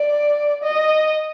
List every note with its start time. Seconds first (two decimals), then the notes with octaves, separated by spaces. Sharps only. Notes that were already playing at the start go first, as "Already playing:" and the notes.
Already playing: D5
0.64 D#5